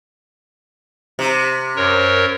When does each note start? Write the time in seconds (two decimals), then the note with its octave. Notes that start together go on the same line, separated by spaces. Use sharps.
1.19 C3
1.76 F#2 A#4 C#5